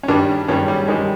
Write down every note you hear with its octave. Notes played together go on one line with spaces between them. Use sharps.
C#4
G2 D#3 G3 D4
G2 D#3 G3 C#4
G3
G2 D#3 G3 G#3